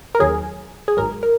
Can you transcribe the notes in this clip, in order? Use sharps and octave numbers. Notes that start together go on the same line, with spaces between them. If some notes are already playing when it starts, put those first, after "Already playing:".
A#4
D#2 D#3 F#3 G#4
G#4
G#1 G#2 F#3 A#4
A#4